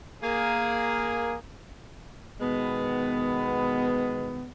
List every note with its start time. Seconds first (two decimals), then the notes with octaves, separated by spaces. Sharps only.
0.23 A#3 G#4
2.41 B2 D#3 G#3 B3